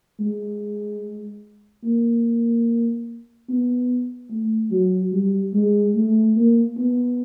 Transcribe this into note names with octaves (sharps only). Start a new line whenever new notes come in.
G#3
A#3
B3
A3
F#3
G3
G#3
A3
A#3
B3